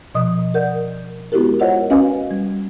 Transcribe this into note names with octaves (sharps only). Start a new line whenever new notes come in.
B2 F3 D#5 D#6
A#4 D5 D#5 F#5 G6
G#3 B3 E4 F#4 G4 A#4
F4 A#4 C5 C#5 D#5 F#5
C#4 F#4 B4 D#5 F5 G#5
G3